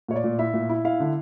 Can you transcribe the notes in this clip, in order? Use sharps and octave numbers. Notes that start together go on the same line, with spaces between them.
A#2 C#5
D5
A#2
E4 E5
A#2
E4
E4 F5
D3